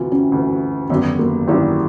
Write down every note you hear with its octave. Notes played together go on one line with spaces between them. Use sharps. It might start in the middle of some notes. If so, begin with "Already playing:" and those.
Already playing: D2 C3 E3 F4 F#4
C#4
D2 C3 E3
G#1 F#2 D3 G3 B3
A#3
G#1 F#2 D3 G3 E4